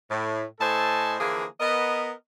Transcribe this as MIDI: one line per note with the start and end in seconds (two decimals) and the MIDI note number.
0.10 0.45 45
0.60 1.15 45
0.60 1.15 69
0.60 1.15 72
0.60 1.15 75
0.60 1.15 80
0.60 1.15 81
1.20 1.45 50
1.20 1.45 52
1.20 1.45 53
1.20 1.45 58
1.20 1.45 68
1.60 2.12 59
1.60 2.12 70
1.60 2.12 75